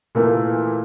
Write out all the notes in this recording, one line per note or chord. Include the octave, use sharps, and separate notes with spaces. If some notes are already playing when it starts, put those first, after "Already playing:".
A#2 E3 A3 A#3